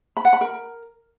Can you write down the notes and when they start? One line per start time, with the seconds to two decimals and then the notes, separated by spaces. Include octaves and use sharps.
0.17 B5
0.25 F#5
0.33 B5
0.41 A#4